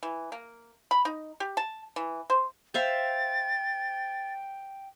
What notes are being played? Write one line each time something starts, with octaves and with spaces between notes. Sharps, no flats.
E3
A#3
B5
D#4
G4
A5
E3
C5
C5 E5 F5 G5 A6